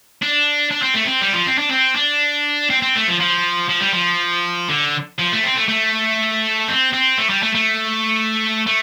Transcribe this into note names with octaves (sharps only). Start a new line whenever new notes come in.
D4
D4
C4
A3
C4
G3
F3
C4
D4
C4
D4
C4
C4
A3
F3
F3
F3
G3
F3
D3
F3
A3
C4
A3
A3
C4
C4
A3
G3
A3
A3
A3